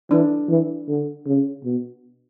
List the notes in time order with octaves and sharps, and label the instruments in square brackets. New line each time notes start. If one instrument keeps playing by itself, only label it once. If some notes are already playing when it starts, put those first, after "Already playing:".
[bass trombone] E3 [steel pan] D4
[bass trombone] E3
D3
C#3
B2